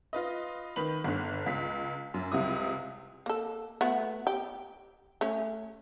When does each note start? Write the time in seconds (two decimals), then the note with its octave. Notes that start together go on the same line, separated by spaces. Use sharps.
0.13 F4 B4 D#5
0.76 D#3 B4 B5 F#7
1.04 G1 D3
1.46 C#2 B6
2.14 F#2
2.32 C#2 C3 G3 E4 D#6
3.26 A#3 A4
3.81 A3 B3 F#4
4.27 G4
5.21 A3 C#4